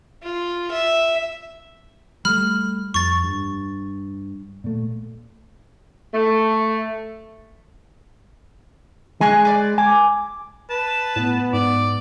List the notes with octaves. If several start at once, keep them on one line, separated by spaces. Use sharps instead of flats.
F4
E5
G3 A3 B5 F6
F2 C#6 A6
G2
A#2 A3
A3
G#3 G#5 C#6 F#6
B4 D5
G#5 D6
B4 A5
A2 B3
G#2 D5